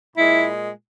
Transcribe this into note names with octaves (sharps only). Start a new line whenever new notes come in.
A#2 G#3 E4